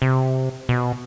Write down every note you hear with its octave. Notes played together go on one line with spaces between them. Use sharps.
C3
B2